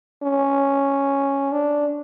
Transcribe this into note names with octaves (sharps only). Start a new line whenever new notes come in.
C#4
D4